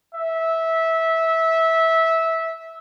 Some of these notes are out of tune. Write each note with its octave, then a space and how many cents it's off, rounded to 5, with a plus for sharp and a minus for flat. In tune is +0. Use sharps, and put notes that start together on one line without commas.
E5 -15